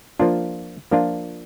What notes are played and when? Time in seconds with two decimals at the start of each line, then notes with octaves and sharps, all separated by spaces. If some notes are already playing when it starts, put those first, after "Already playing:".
0.20 F3 A#3 D4 F4
0.91 F3 A#3 D4 F4